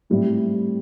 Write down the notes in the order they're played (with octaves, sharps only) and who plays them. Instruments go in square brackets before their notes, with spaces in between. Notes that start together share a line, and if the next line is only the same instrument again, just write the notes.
[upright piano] A2 G3 C4 E4